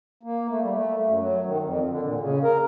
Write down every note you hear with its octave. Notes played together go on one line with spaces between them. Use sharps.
A#3
A3
G3
A3
F#2
F#3
D#3
F2
D3
A#2
C#3
A#4